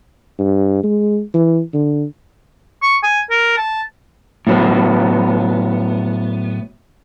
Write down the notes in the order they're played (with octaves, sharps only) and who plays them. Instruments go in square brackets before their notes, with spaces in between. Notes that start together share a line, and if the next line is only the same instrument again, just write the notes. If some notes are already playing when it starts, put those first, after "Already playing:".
[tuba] G2
G#3
E3
D3
[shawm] C#6
G#5
A#4
A5
[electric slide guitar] A2 F#3 B3